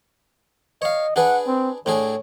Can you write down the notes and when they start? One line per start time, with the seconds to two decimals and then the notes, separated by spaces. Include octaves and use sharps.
0.82 C#5 D#5 F5
1.16 D4 G#4 B4 F#5
1.47 C4
1.86 A2 D4 G#4 C#5